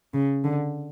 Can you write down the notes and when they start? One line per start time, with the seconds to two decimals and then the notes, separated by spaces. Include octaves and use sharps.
0.14 C#3
0.44 D3